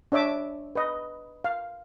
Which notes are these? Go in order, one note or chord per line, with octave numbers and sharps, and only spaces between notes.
D4 C#5 E5 D6
B4 D#5
F5